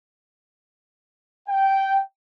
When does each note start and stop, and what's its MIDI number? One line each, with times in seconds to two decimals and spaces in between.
1.49 2.02 79